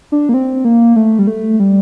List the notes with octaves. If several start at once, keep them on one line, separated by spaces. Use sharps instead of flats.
D4
A#3
C4
A#3
A3
G3
A3
G3